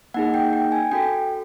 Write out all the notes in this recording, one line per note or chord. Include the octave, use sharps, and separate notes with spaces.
A#3 D#4 G#4 F#5
G5
G5
G#5
C#4 F#4 A4 G5